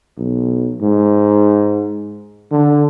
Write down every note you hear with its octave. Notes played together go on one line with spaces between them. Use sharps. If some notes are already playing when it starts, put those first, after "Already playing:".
B1
G#2
D3